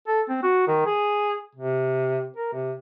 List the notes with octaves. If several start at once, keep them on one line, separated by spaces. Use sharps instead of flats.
A4
C4
F#4
D#3
G#4
C3
A#4
C3